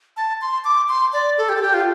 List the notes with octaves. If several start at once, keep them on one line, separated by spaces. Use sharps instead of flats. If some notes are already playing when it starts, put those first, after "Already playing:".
A5
C6
D6
C6
D5
A4
G4
A4
G4
F4